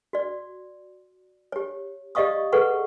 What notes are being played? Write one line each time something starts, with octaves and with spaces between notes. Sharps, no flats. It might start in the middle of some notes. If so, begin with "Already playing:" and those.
F#4 D5
G4 C#5
G4 D5 D#5 F5 C#6 D#6
G#4 A4 B4 F#5 C#6